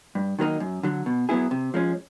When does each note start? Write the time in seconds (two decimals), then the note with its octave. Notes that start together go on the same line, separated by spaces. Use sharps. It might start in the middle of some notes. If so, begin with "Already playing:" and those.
0.15 G2
0.39 D#3 F#3 A#3 D#4
0.60 F#2
0.83 D3 F#3
1.06 B2
1.29 F#3 B3 E4 G#4
1.51 C3
1.74 F3 G#3 C#4